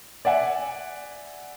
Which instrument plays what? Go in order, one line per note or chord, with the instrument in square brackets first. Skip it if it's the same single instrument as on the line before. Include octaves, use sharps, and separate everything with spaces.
[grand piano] D5 E5 F#5 G#5